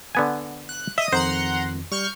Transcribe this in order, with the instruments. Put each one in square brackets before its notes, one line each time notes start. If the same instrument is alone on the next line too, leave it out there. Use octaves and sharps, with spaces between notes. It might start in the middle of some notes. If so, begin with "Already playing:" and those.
[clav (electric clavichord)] D3 B3 G#5
[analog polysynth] F#6
[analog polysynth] D#5 D#6 [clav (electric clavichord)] E5
[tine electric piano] F2 D#3 [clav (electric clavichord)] C5 [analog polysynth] F#5 A#5 C6
[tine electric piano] G3 [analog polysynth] C#6 F6 G6